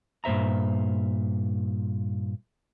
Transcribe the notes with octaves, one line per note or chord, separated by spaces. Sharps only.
G2 A#2 C5 E5 A#5